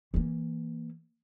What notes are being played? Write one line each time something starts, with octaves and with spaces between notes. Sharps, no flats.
E3 A#3